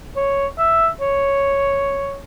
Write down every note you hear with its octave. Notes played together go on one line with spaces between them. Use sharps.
C#5
E5
C#5